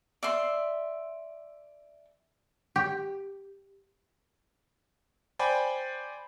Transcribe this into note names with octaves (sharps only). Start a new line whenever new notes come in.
D5 E5 C6
G4
C5 D5 G5 G#5 B5